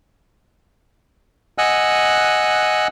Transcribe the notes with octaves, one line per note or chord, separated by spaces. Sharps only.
D#5 F#5 G#5 E6 F#6